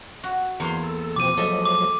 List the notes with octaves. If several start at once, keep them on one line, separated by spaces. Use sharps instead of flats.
F#4
E2 A#3 C6
A4
B2 F3 C4 D6 D#7
F3 F#3 G#3 A4 D#5 E5
D6